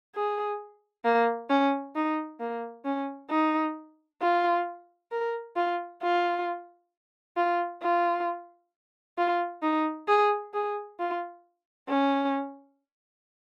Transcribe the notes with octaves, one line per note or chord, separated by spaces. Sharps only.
G#4
A#3
C#4
D#4
A#3
C#4
D#4
F4
A#4
F4
F4
F4
F4
F4
D#4
G#4
G#4
F4
C#4